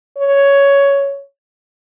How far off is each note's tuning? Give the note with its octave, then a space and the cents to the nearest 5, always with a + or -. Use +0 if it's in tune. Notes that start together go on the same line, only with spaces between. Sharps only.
C#5 +10